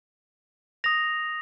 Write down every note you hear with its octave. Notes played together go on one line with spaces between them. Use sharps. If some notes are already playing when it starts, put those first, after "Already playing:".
D#6 A#6 F7